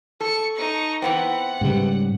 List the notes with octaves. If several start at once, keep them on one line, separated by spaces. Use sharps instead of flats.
A4 C#6 C#7
D#4 C#6
E3 B3 C4 F#5
G#2 C#3 G3